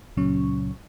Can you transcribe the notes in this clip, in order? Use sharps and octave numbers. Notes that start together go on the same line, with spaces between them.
C#2 A#2 C#3 F#3 C#4 C#6